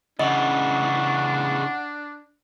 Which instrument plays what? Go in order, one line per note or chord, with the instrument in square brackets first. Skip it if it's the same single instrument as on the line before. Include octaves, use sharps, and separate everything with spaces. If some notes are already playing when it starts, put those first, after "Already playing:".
[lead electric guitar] C#3 E3 [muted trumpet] D4 [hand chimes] D#5 [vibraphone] F#5